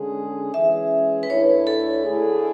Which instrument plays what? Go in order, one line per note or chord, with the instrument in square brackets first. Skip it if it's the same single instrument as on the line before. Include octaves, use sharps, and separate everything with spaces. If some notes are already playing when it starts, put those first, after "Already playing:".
Already playing: [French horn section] D3 G#3 C#4 G#4
[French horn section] E3 G#3 C#4 G#4 [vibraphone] E5
[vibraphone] B4
[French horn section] D2 D3 A3 E4 [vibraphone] C#5
[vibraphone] A4
[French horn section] D3 A3 E4 G#4